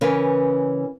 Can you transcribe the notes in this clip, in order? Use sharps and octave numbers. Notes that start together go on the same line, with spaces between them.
C#3 E3 C#4 A#4 B4 F5